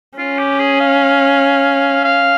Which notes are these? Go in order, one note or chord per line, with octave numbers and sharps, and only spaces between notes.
C#4 F4
G4
G#4
F5
F5